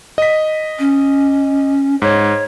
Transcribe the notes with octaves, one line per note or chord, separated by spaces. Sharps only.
D#5 B6
C#4
G#2 C#5